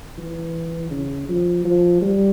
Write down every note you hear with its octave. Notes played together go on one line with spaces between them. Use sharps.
E3
C#3
F3
F3
G3